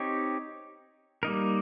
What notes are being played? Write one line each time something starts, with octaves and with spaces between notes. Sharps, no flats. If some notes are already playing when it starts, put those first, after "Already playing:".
Already playing: C4 D#4 G4 C#5
G3 A#3 D#4 A#4